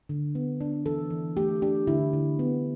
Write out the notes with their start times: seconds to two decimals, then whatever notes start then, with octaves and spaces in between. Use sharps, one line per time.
0.09 D3
0.35 B3
0.61 D4
0.86 E3 A4
1.11 E3
1.37 A3 G4
1.62 D4 G4
1.87 D3 E4
2.13 D3
2.39 B3